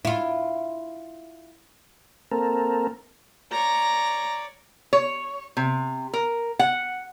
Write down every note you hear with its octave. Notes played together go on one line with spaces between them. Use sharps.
E4 F4
A#3 C4 A4 A#4
C#5 D5 A#5
C#5
C3
A#4
F#5